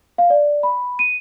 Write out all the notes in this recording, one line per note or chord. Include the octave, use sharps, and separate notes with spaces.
F5
D5
B5
D#7